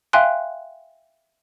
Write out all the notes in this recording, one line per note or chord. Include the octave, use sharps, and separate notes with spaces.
E5 F5 G5 G#5 C6 F#6